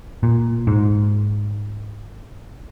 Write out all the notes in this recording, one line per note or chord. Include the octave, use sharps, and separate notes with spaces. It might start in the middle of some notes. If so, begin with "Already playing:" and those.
A#2
G#2